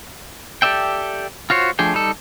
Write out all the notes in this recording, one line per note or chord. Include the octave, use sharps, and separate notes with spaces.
G4 A4 D5 E5 G5
F4 F#4 C5 C#5
F3 A3 D4 G#4 G5
G3 D#4 A4